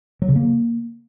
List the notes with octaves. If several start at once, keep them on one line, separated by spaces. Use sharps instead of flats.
F#3
C#3
A#3